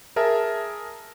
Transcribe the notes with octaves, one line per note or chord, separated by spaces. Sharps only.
G#4 A#4 E5 A5